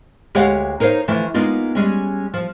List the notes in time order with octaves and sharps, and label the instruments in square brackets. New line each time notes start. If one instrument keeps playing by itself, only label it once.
[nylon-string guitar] D2 G#3 G4 C#5 F5 F#5
D#4 A#4 C5 C#5 F5
D3 E3 F3 A3
G#3 A#3 B3 D#4 F4
G3 G#3 C#4
F3